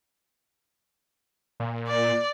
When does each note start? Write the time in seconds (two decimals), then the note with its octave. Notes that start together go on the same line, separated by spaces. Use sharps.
1.60 A#2
1.88 D5